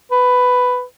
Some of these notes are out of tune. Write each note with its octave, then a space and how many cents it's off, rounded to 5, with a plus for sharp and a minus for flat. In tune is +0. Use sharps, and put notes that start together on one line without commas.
B4 +10